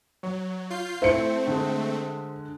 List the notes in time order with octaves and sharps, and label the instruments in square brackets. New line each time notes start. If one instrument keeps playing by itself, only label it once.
[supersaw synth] F#3 [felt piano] C#5
[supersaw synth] F4 G6 C7
[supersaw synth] A3 C4 [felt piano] E4 [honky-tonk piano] C5 C#7
[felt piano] D3 G#3